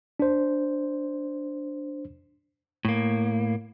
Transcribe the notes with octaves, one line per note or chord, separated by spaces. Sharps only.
D4 C5
A2 A#3